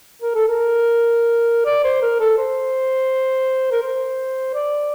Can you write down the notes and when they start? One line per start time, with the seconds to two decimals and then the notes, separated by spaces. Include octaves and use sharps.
0.22 A#4
0.35 A4
0.48 A#4
1.65 D5
1.84 C5
2.02 A#4
2.20 A4
2.38 C5
3.72 A#4
3.82 C5
4.54 D5